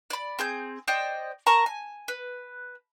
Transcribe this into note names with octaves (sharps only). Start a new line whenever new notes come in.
D5 B5
C4 G#4 G6
C5 D5 D#5 G5
A#4 A5 A#5 C#6
G#5
B4